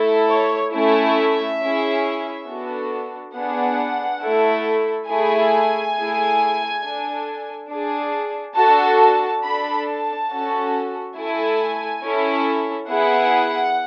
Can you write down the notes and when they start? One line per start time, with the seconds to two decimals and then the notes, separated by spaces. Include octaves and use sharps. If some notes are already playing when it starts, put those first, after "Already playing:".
Already playing: A3 E4 A4
0.30 C#5
0.74 A3 C#4 E4 E5
1.61 C#4 E4 G#4
2.47 B3 D4 F#4 A4
3.34 B3 D4 G#4 F#5
4.22 A3 E4 A4
5.07 A3 E4 G#4 G#5
5.95 A3 E4 G#4
6.82 D4 A4
7.68 D4 G#4
8.55 D4 F#4 A4 A5
8.99 A5
9.42 D4 A4 B5
9.86 A5
10.29 C#4 F#4 A4
11.16 A3 E4 A4 G#5
12.03 C#4 E4 A4
12.89 B3 E4 G#4 F#5